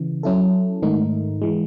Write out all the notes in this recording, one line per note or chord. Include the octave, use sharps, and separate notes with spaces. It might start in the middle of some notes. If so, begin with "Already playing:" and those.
Already playing: C#3 E3
F#3 C#4 E4 A4
G#2 D#3 A3 D#4
E3 G#3